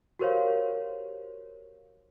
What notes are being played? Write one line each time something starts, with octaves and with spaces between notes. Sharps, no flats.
F#4 G4 A#4 C5 C#5 F5